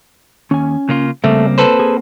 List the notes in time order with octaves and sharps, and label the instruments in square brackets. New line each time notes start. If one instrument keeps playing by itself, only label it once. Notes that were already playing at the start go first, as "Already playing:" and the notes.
[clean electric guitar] D#2 [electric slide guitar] C#4 G#5
[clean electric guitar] C#3 A#3 F4
[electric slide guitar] C#3 G3 [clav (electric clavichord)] A3 [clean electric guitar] A#3 C4
[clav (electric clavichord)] A4 B4 C5
[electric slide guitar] G#4